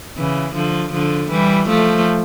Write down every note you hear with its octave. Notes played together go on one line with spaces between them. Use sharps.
C#3 E3
D3 F3
D3 F3
E3 G3
F3 A3